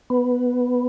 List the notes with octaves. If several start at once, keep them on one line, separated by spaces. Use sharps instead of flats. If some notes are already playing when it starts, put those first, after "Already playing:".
B3